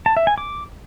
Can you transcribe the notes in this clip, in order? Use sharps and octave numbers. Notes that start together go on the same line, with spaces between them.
A5
E5
G#5
D6